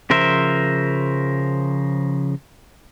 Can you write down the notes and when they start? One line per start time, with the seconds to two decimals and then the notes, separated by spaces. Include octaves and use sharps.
0.10 C#3 F3 A#4 C5 E5